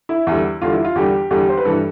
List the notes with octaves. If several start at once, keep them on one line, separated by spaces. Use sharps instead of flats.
E4
E2 D3 G3
E2 D3 G3 F4
E4
F4
E2 D3 G3 G4
E2 D3 G3 G4
C5
B4
G2 E3 G3 A4